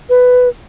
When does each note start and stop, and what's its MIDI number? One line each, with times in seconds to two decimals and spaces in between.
0.09 0.49 71